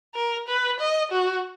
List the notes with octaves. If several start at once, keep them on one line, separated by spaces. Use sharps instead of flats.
A#4
B4
D#5
F#4